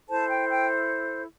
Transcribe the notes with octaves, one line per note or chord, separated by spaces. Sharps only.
E4 A4 C5 A5
G5
G5